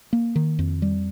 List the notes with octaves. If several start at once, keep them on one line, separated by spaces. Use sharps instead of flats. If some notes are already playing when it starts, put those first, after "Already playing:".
A#3
D#3
F2
G3